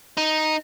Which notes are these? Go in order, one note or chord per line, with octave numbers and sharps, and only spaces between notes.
D#4